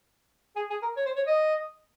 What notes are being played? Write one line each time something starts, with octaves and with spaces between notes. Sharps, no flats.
G#4
G#4
A#4
C#5
C5
C#5
D#5